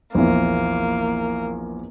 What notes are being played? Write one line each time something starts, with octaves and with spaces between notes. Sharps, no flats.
A#1 E2 A#3 E4